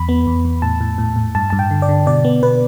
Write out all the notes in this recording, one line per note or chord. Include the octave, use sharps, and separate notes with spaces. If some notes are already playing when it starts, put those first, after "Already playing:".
Already playing: E2 B5
B3
E2
E2
A2 A5
A2
A2
A2
G2 A5
G2 A5
G5
D3
D5
D3
B2 D5
B3
B2 B4